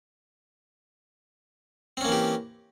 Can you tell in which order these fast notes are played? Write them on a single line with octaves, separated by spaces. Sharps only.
C4 C#4 A#3 E3 G4